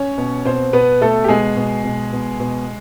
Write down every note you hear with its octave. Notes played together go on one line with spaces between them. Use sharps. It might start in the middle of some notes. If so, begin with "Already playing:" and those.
Already playing: C#4 C#5
B2
B2 C4 C5
B2 B3 B4
B2 A3 A4
G4
B2 G#3 G#4
B2
B2
B2
B2